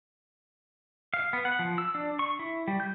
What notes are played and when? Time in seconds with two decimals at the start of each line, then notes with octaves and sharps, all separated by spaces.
1.14 F5
1.33 B3
1.45 F#5
1.59 F3
1.78 E6
1.95 D4
2.19 C#6
2.39 E4
2.68 G3
2.80 G6